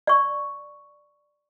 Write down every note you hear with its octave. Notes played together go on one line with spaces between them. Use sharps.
D5 C#6